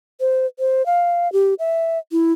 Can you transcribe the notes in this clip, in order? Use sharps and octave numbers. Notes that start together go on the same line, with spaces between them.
C5
C5
F5
G4
E5
E4